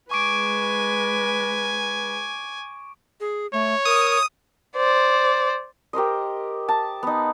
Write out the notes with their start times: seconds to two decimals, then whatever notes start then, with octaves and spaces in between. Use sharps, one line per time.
0.11 G#3 B4 G#5 C#6 D6 D7
3.20 G#4
3.53 A3 C#5
3.85 A#4 D#6
4.77 C5 D5
5.93 G4 A#4 C5 D#5
6.68 A5
7.03 B3 D#4